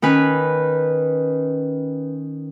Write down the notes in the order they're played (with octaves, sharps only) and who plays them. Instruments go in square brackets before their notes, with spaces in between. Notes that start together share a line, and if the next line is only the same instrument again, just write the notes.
[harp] D#3 C#4 B4